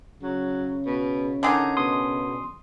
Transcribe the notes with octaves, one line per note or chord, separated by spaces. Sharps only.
C#3 F#3
B2
D3 D#3 D#4 G#4
B2 C6 D#6